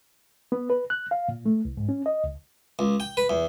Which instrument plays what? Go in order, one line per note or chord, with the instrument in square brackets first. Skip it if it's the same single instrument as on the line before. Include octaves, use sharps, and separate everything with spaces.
[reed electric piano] B3
B4
F#6
F5
A#2
A3
C2
G#2
C#4
D#5
C#2
[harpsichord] C#2
G5
B4
E2